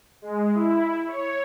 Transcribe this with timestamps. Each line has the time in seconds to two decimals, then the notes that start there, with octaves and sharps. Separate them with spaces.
0.22 G#3
0.55 E4
1.08 C#5